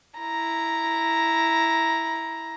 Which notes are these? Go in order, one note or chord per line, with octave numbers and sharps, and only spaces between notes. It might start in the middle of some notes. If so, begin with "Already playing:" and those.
E4 A#5